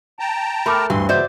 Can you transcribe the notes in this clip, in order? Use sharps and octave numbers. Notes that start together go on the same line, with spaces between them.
G5 A5 A#5
A3 A#4 B5 D6 F6
D2 G2 E3 C6
A#2 C#3 E3 F#4 C5 D5 E5